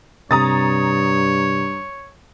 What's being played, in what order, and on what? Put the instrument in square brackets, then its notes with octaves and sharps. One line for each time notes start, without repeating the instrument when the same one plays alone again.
[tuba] G2 [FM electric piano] C3 [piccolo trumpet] C#5 [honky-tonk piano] A#5 D#6 A6